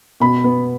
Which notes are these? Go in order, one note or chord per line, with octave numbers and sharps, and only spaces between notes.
B2 B5
B3